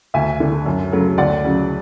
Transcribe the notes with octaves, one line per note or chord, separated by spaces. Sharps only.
D2 E5 G#5
D3 A3
F#2
C#3 F#3 A3
D2 D5 F#5
C#3 F#3